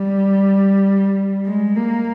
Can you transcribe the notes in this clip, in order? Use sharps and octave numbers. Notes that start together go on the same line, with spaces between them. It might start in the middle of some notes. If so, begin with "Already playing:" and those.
Already playing: G3
G#3
A#3